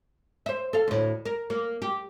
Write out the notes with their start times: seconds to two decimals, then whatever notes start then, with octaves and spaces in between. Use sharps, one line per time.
0.46 C5 E5
0.73 A4 F5
0.88 D2 A2
1.25 A#4
1.50 A#3
1.82 G4